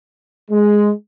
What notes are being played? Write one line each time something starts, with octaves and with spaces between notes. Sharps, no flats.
G#3